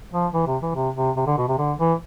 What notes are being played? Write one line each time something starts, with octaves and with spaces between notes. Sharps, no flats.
F3
E3
C3
E3
C3
C3
C3
D3
B2
C3
D3
E3